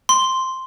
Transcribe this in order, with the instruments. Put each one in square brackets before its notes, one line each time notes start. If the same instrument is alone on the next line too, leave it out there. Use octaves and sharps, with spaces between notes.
[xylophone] C6